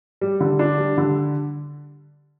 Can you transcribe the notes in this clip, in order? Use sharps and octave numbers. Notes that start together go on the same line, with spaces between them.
G3
D3
D4
G3
D3